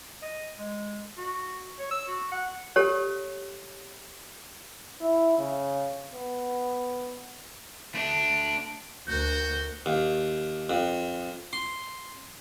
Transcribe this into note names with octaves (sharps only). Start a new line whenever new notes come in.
D#5
G#3
F#4
C#5
E6
F#4
F#5
G4 A4 C#5
E4
C#3
B3
A3 D4
D2 F#4 A#4 G6
D#2
F2
C6